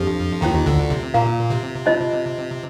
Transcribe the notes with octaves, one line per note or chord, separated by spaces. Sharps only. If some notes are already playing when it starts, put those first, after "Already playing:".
Already playing: F2 F3 D4 G4
D#2 D#3 F4 C5 G5 A#5
D2 D3
C3
A#2 F4 A#4 F5 A#5
C3
F4 C5 D#5 A5